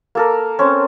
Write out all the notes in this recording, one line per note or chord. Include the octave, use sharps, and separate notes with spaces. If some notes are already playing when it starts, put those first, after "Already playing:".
A#3 A4 A#4
C4 C#4